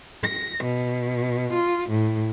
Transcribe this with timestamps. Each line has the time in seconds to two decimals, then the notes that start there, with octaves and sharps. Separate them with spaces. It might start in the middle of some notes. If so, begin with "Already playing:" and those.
0.23 A#6
0.64 B2
1.53 F4
1.90 A2